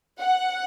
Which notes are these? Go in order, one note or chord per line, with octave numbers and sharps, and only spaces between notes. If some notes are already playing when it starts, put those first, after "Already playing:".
F#5